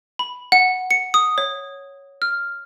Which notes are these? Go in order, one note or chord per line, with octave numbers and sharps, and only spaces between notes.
B5
F#5
C#7
D#6
C#5
F6